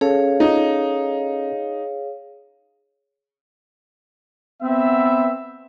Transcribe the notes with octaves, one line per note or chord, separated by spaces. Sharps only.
C#4 G#4 A4 C#5 F5
D#4
B3 C4 E5